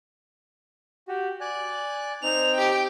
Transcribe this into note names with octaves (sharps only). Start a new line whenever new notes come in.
F#4 G4
D5 G#5 F#6
C4 D#4 F7
G4 G5